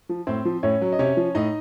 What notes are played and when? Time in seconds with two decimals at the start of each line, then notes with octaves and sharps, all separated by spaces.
0.09 F3
0.27 A2 C4 C5
0.45 F3
0.63 A2 C#4 C#5
0.81 F#3
0.92 D#5
0.99 C3 C#4 C#5
1.17 F3
1.35 A2 D#4 D#5